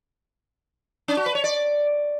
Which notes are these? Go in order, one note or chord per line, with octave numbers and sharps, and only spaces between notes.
C#4
F#4
B4
C#5
D5